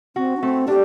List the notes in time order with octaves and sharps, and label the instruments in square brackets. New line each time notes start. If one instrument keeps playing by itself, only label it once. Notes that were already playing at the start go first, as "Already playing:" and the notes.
[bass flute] C4 [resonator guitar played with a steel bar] F#4
[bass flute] D4
[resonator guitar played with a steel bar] A3 [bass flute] C4
[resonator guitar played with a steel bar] D4 [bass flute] G4